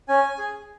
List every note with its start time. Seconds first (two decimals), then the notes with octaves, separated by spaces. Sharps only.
0.08 C#4 G#5
0.39 G#4